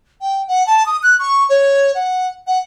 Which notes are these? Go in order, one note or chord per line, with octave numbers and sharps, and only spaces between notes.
G5
F#5
A5
D#6
F#6
C#6
C#5
F#5
F#5